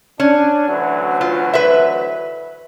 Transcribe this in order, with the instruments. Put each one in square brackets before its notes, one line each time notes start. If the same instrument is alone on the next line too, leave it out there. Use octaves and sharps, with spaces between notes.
[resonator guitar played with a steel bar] C#4 [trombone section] D4
[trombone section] D2 E3 F#3
[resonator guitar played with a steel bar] F4
B4 E5